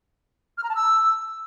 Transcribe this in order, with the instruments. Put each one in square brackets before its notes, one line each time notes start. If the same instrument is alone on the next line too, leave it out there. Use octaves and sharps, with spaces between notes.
[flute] F6
A#5
A5
E6